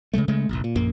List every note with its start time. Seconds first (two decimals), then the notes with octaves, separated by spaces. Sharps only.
0.13 C#3 E3 G#3 A3
0.28 C#3 G#3 A3
0.49 F1 A#1
0.64 A#2
0.76 A#1 F#2 A#3